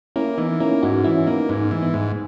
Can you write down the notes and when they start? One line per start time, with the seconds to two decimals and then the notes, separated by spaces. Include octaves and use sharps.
0.16 A#3 C#4 E4
0.37 E3 B3 D#4
0.60 A#3 C#4 E4
0.83 G#2 D#4 F#4
1.04 E3 C#4 E4
1.27 A#3 B3 D#4
1.49 G#2 B3 D#4
1.71 E3
1.82 B3 D#4
1.94 G#2